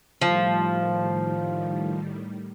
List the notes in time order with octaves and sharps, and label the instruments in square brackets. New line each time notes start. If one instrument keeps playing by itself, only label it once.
[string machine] A2 D#3 G3 [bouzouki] F3